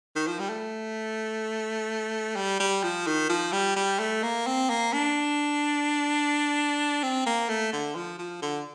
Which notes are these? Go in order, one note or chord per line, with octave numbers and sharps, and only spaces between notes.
D#3
F3
G3
A3
G3
G3
F3
D#3
F3
G3
G3
A3
A#3
C4
A#3
D4
C4
A#3
A3
D3
F3
F3
D3